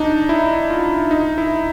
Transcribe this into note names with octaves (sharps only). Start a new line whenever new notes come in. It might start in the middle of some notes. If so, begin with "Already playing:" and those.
Already playing: D4 D#4
E4
F4
D#4
E4